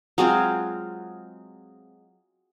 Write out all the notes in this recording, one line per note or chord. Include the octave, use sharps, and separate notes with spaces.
F#3 G#3 C4 F4